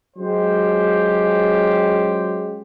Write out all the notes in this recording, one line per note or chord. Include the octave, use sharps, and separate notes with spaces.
F#3 G#3 C#4 F4 G4 C5